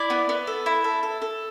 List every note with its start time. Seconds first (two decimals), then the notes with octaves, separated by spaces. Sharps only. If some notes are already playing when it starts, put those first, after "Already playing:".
Already playing: E4 D5
0.10 B3
0.29 B3
0.47 A4
0.66 E4
0.84 A4
1.03 A4
1.22 A4